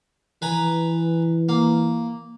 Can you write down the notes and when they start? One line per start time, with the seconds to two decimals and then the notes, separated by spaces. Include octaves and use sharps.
0.42 E3 B4 G#5 A#5
1.49 A#3